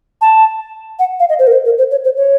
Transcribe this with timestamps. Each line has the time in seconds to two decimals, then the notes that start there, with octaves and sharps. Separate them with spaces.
0.21 A5
0.99 F#5
1.20 F5
1.29 D#5
1.39 C5
1.47 A#4
1.52 C5
1.65 A#4
1.78 C5
1.91 C#5
2.04 C5
2.17 C#5